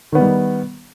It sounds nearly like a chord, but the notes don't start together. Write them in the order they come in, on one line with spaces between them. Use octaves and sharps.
D#3 B3 D#4 G3